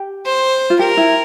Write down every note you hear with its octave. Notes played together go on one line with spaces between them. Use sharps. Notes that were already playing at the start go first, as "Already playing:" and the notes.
Already playing: G4
C5
F4
G4 A#4
E4